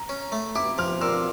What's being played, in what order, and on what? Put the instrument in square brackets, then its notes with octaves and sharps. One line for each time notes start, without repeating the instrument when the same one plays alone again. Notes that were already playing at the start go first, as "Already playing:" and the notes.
Already playing: [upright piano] A#5
[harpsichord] C#4
A3
[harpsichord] E4 [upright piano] D6
[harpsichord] F3 [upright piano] F6
[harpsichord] A#2 [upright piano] E6